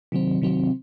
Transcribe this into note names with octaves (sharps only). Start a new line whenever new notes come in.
C3 D#3 F#3 C4
C3 D#3 F#3 C4